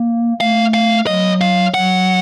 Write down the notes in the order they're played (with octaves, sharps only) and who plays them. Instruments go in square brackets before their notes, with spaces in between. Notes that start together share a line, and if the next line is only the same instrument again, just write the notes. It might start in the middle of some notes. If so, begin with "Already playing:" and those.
Already playing: [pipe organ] A#3
[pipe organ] A3 [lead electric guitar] F5
[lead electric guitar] F5
[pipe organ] F#3 [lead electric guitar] D#5
[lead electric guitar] F5
[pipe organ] F#3 [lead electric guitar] F#5